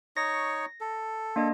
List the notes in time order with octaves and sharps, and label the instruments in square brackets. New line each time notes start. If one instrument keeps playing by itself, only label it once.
[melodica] D#4 C#5 C#6 [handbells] A#6
[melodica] A4
[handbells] A#3 D4 D#5